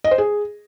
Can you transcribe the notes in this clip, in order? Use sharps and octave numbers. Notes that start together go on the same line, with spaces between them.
D#5
C5
G#4